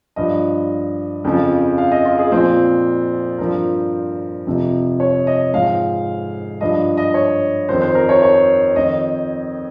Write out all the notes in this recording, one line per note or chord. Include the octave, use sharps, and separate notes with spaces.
G2 F3 D#5
F2 C#3 F3
F5
D#5
F4
G#4
A#2 F3 C4
G2 F3 A#4
F2 C3 F3
C#5
D#5
G#2 F3 F5
G2 F3 D#5
D#5
C#5
F2 D#3 C5
C5
A#4
C#5
C#5
F2 D#3 D#5